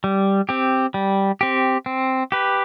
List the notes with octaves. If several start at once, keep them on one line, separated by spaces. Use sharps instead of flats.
G3
C4 G4
G3
C4 G4
C4
G4 B4